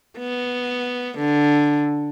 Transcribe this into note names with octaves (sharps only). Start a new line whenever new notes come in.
B3
D3